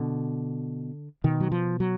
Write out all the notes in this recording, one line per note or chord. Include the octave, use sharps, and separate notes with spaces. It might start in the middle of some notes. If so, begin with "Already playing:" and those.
Already playing: B2 D3
B2 D#3
F#3
F3
F#3